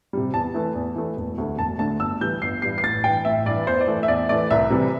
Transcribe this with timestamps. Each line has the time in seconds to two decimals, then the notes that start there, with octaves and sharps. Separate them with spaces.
0.13 C3 G3
0.34 E2 A5
0.54 E3 A3
0.75 E2
0.96 E3 A3
1.17 E1
1.38 D2 D3 A3
1.58 E1 A5
1.79 D2 D3 A3 A5
2.00 G1 E6
2.21 G2 E3 G3 G6
2.42 G1 C7
2.62 G2 E3 G3 C7
2.78 C7
2.83 A1 A6
3.04 G2 E3 G5
3.25 A1 E5
3.46 G2 E3 D5
3.67 E2 C5
3.81 D5
3.87 E3 A3
4.03 E5
4.08 E2 D5
4.29 E3 A3 D5
4.51 C2 E5
4.70 C3 E3 G3